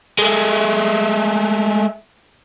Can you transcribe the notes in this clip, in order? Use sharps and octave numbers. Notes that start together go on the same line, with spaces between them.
G#3 A3